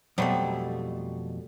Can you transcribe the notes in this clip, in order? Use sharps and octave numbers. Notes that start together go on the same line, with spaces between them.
F2 B2 F#3 G3 A3 C5